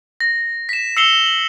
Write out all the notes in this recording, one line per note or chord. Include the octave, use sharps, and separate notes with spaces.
A#6
B6 E7
E6 C7 C#7 E7 F7 G7
F#7